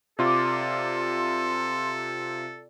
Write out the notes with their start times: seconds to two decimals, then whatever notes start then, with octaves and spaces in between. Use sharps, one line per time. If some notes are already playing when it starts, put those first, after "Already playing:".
0.19 C3 F4 A4 D5 C6 D6